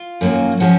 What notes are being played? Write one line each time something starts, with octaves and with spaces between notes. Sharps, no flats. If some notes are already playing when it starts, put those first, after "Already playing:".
Already playing: F4
F#2 D#3 F#3 A#3 C#4
F3 G#3 C#4 F#4